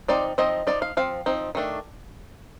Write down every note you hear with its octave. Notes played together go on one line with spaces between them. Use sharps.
F3 C4 D#4 D5
F3 C4 D#4 D#5
F3 C4 D#4 D5
F5
F3 C4 F5
F3 C4 D#4
D#3 A3 D4